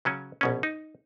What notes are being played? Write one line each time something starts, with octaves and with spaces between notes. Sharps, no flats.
C#3 F#3 C#4
A#1 B2 C#4
D#4